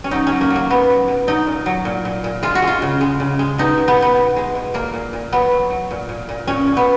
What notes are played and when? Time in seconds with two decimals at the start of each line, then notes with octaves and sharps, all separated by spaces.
0.04 C#4
0.11 F#3 D#4
0.27 F#3 C#4
0.41 A#3
0.50 F#3
0.56 A#3
0.70 B2 B3
0.89 F#3
1.08 B2
1.27 F#3 D#4
1.47 A#2
1.66 F#3
1.85 A#2
2.05 A#2
2.24 A#2
2.43 G#3 F4
2.55 F#4
2.62 G#3
2.67 F4
2.82 C#3
3.01 G#3
3.20 C#3
3.39 G#3
3.58 B2 D#4
3.78 B2
3.88 B3
3.97 B2
4.02 B3
4.17 B2
4.36 G#3
4.55 B2
4.74 A#2 A#3
4.93 A#2
5.13 A#2
5.32 F#3 B3
5.51 F#3
5.70 F#3
5.91 A#2
6.09 A#2
6.29 A#2
6.47 A#2 C#4
6.67 A#2
6.77 B3